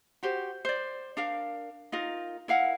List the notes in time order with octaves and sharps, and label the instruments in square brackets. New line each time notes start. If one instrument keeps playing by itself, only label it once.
[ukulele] F#4 G4 C5
C5 D5
D4 A#4 F5
D#4 F4 A#4
E4 A#4 F5 F#5